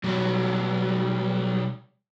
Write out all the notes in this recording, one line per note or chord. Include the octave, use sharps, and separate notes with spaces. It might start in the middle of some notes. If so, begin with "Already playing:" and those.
B1 F#3 G3